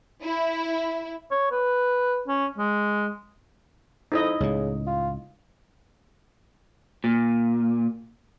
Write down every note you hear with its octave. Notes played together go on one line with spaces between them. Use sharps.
E4
C#5
B4
C#4
G#3
F2 D#4 E4 D#5
C#2 A2 C#3
F4
A#2